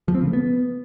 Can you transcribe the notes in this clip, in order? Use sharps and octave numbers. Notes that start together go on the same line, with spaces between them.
F3
C4
C#3
A3
B3